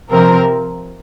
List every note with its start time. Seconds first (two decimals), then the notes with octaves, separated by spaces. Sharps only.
0.11 C3 F3 C4 A#4